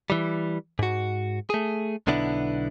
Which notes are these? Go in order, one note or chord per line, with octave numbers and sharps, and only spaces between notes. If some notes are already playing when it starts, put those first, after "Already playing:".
E3 G3
G#2 F#4
A3 G#4
B1 D3 B3 D4 E4